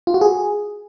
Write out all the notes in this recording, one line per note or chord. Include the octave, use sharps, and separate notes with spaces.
F4
F#4
G#4